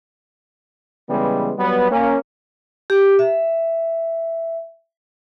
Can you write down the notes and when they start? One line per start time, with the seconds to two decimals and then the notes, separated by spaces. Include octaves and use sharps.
1.09 C#3 E3 G3 G#3 B3
1.58 F#3 G3 B3
1.91 A#3 C#4
2.90 G4
3.19 E5